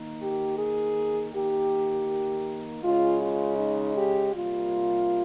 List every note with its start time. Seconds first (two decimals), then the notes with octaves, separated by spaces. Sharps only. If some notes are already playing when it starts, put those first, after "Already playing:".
Already playing: D#3 A#3
0.21 G4
0.58 G#4
1.33 D#3 A#3 G4
2.83 C#3 G#3 F4
3.20 F4
3.58 D#4
3.95 G4
4.33 C3 G3 A#3 F4